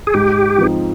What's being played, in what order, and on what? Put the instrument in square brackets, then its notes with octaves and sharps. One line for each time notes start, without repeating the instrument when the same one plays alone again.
[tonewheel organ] G#4
[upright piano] G#2 [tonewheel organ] G4
[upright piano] F3 C4 D#4